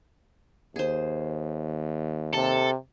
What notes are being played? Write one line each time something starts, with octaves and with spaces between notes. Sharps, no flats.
D#2 G#4 C5
C3 A4